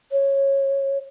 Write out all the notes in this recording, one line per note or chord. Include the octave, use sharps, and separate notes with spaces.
C#5